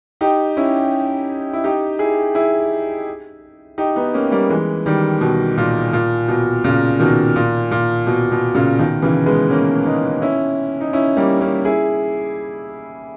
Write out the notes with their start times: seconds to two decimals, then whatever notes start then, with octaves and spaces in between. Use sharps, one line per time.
0.21 D#4 G4
0.57 C#4 E4
1.53 E4
1.64 D#4 G4
1.99 E4 G#4
2.35 E4 G#4
3.78 D#4 G4
3.96 B3 D#4
4.14 A#3 C#4
4.31 G3 A#3
4.50 E3 G#3
4.86 D#3 G3
5.21 B2
5.57 A#2
5.93 A#2
6.28 B2
6.64 A#2 C#3
6.99 B2 D#3
7.36 A#2
7.71 A#2
8.07 B2
8.32 B2
8.55 A#2 C#3
8.79 B2 D#3
9.02 C#3 E3
9.26 G#3 B3
9.50 A#3 C#4
9.86 B3 D#4
10.22 C#4 E4
10.81 D#4
10.93 C#4 E4
11.17 G3 A#3
11.41 A#3 C#4
11.65 E4 G#4